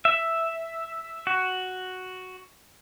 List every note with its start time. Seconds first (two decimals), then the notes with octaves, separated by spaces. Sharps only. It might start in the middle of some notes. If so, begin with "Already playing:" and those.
0.05 E5
1.27 F#4